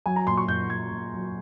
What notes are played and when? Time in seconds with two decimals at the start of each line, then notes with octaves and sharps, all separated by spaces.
0.06 F#3 G#5
0.16 A#5
0.27 A#2 C6
0.37 C#6
0.48 A#2 G6
0.70 F#3 G#6
0.91 A#2
1.13 F#3